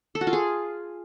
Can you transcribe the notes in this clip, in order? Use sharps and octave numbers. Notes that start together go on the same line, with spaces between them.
A4
F#4
F4
G#4